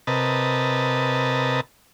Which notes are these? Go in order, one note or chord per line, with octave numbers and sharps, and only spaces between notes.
C3 A#4 B4 D#5 A5